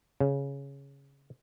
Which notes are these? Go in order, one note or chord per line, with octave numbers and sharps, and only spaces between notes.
C#3